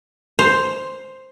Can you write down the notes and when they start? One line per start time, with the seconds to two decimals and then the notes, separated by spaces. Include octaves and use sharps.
0.39 C5